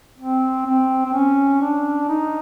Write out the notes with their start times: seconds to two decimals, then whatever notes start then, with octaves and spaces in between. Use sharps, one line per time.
0.18 C4
0.66 C4
1.05 C4
1.13 C#4
1.61 D4
2.08 D#4